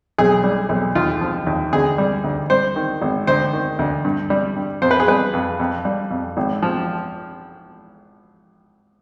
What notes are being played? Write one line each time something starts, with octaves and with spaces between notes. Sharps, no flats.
B1 G#4
G3
B1
D#2 F4
F3
D#2
D2 G#4
G3
D2
G3 C5
D#3
G#1
D2 C5
D#3
D2
G2
G3
G2
F2 C5
B4
G#4
G3 B4
F2
F2
G3
F2
G#1
F3